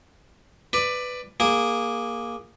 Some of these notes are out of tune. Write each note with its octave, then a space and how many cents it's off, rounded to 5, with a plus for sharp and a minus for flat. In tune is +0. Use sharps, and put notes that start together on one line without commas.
B4 +10 D5 +15
A#3 +5 G#4 -15